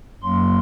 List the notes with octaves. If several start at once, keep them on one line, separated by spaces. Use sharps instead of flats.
F#2 F#3 A#3 C6